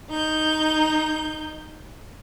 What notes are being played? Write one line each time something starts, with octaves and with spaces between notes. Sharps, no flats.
D#4 G6